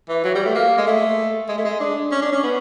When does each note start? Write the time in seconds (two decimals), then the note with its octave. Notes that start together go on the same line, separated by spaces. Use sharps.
0.09 E3
0.24 F#3
0.35 G3
0.45 A3
0.55 A#3
0.78 G#3
0.87 A3
1.49 G#3
1.58 A3
1.65 G#3
1.80 D4
2.12 C#4
2.22 D4
2.33 C#4
2.43 B3